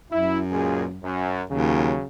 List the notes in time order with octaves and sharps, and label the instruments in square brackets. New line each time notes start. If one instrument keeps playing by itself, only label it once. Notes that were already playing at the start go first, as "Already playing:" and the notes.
[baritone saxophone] F#2 [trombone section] E4
[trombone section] C#2 A#2 G#4
F#2
[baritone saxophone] D#2 [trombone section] C#3 F#3